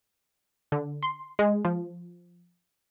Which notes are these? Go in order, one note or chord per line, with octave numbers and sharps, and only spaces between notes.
D3
C6
G#3
F3